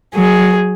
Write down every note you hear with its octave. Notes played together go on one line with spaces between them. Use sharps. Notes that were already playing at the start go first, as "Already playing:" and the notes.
F#3 G#4